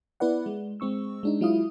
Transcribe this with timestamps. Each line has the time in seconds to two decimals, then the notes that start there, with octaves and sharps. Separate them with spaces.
0.20 B3 E4 B4 D5 F#5
0.46 G#3
0.80 G#3 C4 C#6 E6
1.23 G#3 D4 D#4
1.41 F#3 G#3 E4 F4 F5 D#6